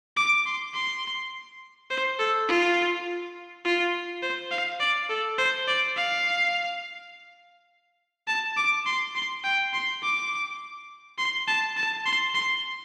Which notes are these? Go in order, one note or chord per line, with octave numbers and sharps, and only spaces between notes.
D6
C6
C6
C5
A4
F4
F4
C5
F5
D5
A4
C5
D5
F5
A5
D6
C6
C6
G5
C6
D6
C6
A5
A5
C6
C6